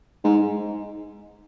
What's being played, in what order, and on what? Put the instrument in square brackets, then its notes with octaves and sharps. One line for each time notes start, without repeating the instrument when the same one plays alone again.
[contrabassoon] G#2